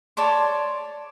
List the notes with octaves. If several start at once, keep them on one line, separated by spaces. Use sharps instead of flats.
C#5 D5 A5 C6